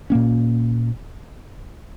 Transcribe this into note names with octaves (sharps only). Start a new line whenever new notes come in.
A#2 A#3 C#4